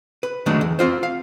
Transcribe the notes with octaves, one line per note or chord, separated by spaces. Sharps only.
B4
D3 D#3 F#3 G#3 A3 D4
E2
C4 F4 C5
F5